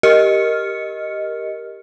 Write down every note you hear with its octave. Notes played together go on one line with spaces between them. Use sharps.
G4 A#4 D#5 F6 C#7